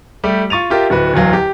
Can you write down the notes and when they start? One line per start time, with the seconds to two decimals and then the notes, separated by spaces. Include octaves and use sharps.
0.24 G3 A3 G4
0.50 F4 C#6 A6 D#7 F7
0.70 F4 G4 A#4 E5
0.90 D1 F#4 B4
1.14 D1 E2 F#3 F5
1.33 G4